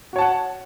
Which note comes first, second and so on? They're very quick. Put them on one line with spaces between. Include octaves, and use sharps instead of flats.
F#4 C#5 A5 F#5